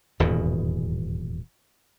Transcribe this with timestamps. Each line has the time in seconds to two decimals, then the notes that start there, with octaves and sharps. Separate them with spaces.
0.20 D#1 E2 G#2 B2